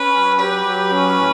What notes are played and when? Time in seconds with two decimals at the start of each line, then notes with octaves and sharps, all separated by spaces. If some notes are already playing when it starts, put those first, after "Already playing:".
Already playing: C#4 B4
0.14 F#3
0.39 G4 B4
0.65 F#3
0.91 C#4
1.16 A2